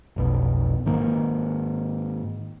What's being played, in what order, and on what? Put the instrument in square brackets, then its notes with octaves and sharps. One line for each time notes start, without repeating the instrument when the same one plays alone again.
[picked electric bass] F1 B1 B2
G#2 D#3 A#3